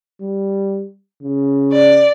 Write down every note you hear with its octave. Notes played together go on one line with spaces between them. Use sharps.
G3
C#3
D5